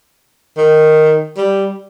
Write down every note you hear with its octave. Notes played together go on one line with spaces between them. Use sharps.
D#3
G3